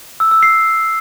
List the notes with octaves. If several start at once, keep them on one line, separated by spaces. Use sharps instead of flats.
E6
E6
C7